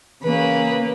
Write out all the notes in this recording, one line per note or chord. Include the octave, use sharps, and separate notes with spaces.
C#3 E3 A#3 B4